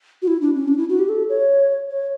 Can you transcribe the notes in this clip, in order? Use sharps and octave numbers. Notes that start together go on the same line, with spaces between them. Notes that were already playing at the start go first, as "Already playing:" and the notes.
F#4
E4
D4
C#4
D4
E4
F#4
G4
A4
C#5
C#5